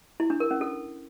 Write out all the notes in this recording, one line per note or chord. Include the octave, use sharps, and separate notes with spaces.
E4
D4
A#4
C#4
A4